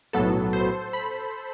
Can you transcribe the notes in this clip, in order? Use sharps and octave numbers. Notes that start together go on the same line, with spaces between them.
B1 A2 F#3 B3 A4
C5
B5